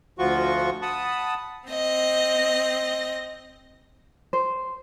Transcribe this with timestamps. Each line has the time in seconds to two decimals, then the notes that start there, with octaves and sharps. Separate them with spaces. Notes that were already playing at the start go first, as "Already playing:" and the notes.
0.19 D2 F3 F4 F#4 C#6
0.82 F#5 A5 B5 D#6
1.68 C4 D#5 A#6
4.33 C5